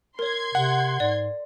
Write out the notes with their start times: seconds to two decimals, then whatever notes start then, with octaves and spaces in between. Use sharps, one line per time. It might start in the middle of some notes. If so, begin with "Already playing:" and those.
0.19 A#4 C#5 C6 G#6
0.55 C3 F#5
1.00 G#2 D5